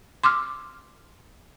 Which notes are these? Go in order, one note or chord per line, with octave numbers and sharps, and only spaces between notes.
C6 D6 E6 F6